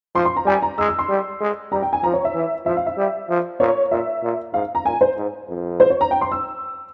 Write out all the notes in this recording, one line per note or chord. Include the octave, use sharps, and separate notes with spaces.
F3 C6
C6
A#5
G3 G#5
A#5
G#3 E6
E6
C6
G3
G#3
G3 A#5
G5
G#5
F3 A#5
C#5
E5
E3
F3 E5
F5
E5
G3
F3
A#2 C#5
A#2 E5
A#2
G#2 F5
A#5
A#2 G#5
C5
G#2
F2
C5
C#5
A#5
G5
C6
E6